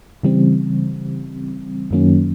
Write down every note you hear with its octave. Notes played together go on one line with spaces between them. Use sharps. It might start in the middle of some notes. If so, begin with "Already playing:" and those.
C#3 E3 G3 C4
F#2 D#3 F#3 A#3 C#4